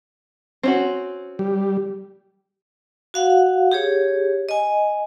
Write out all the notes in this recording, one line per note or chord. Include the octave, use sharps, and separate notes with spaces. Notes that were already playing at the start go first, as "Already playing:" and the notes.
C4 C#4 F#4
G3
F#4 F5 F#5
G4 G#4 C#5
D#5 G#5